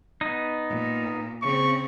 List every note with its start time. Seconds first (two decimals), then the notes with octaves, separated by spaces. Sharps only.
0.21 B3 D#4
0.69 A#2
1.43 C#3 C4 C#6